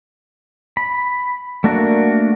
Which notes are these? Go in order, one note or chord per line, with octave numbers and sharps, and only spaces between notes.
B5
A3 A#3 D4 F#4 A#4